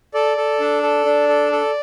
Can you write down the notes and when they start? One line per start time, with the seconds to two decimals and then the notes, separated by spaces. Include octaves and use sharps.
0.14 A4 D5
0.37 A4
0.60 D4
0.83 A4
1.05 D4
1.29 A4
1.52 A4